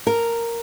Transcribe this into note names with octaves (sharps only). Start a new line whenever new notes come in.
A#4